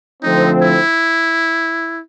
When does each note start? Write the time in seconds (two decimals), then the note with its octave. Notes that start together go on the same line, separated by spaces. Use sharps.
0.23 D3 F3 A3 C4 D#4
0.62 E4